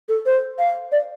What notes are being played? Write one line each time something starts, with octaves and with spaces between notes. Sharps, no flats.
A4
C5
F5
D5